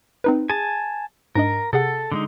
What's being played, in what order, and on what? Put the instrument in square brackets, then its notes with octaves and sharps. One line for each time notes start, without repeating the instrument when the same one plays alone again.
[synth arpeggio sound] C4 D#4 B4
[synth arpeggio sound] G#4 [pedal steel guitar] G#5 A5
[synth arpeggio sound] G#2 D4 D#5 [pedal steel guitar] A#4
[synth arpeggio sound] C3 G#4 F#5 [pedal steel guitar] A4
[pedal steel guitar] D3 G#3 D#4